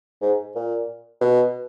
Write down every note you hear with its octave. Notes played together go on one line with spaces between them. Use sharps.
G#2
A#2
B2